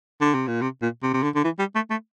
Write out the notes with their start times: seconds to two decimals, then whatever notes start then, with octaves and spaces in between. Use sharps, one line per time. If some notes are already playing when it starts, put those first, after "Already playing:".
0.21 D3
0.34 C3
0.47 A#2
0.62 C3
0.82 A#2
1.03 C3
1.14 C3
1.23 D3
1.35 D3
1.44 E3
1.59 G3
1.75 A3
1.91 A3